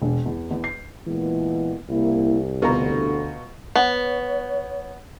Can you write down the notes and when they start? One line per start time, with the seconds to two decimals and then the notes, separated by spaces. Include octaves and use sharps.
0.02 E1
0.26 E2
0.51 E2
0.64 C7
1.07 A#2 E3 G#3 B3
1.89 C2 A#3 E4
2.62 D2 B2 D3 F4 A#5
3.76 B3 C#5